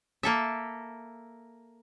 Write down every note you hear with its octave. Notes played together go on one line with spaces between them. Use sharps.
A#3 A4 E5